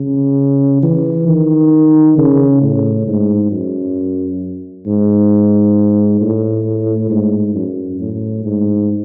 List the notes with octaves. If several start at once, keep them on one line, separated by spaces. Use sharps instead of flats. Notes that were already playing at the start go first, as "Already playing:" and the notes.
Already playing: C#3
E3
D#3
C#3
A2
G#2
F#2
G#2
A2
G#2
F#2
A2
G#2